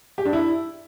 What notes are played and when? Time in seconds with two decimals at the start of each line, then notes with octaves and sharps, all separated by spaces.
0.18 G4
0.25 D4
0.33 E4